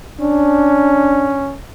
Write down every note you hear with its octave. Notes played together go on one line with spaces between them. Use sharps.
C#4 D4